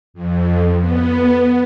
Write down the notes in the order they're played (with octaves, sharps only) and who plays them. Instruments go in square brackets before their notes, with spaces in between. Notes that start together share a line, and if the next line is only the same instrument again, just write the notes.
[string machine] F2
B3